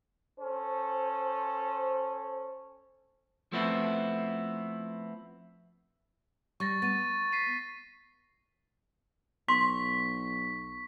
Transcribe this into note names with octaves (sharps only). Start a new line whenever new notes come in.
C#4 A4 C5
F3 A3 B3 C4 E4
G3 C#6 A6 A#6
B3 A6 D#7
B6 C7 D#7
B1 C6 C#6 B6